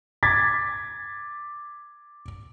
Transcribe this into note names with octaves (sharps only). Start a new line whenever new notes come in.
D6 G#6 A6 B6